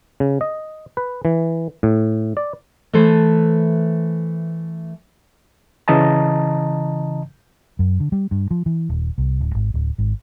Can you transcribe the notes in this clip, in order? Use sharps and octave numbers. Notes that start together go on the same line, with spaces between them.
C#3
D#5
B4
E3
A2
D5
E3 A3 A4 B4 C5
C#3 E3 D#5 A5 A#5
F#2
D3
G3
G2
F3
E3
D#1
C2
D1
G#1
D1
G#1